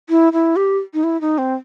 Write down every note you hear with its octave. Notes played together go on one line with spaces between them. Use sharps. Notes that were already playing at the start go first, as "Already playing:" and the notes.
E4
E4
G4
D#4
E4
D#4
C4